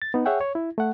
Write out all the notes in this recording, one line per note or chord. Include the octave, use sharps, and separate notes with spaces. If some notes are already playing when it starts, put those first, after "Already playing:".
A6
B3 D#4
G#4 C#5 E5 F#5 G5
C#5
E4
A3 F#5